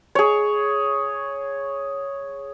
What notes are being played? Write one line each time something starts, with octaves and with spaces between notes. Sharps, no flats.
G#4 C#5